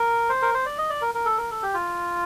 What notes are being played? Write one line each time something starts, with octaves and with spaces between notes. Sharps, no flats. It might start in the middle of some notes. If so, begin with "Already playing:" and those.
Already playing: A#4
C5
A#4
C5
D5
D#5
D5
A#4
A#4
A4
A#4
A4
G4
F4